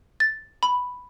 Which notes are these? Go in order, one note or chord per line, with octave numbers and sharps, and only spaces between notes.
A6
B5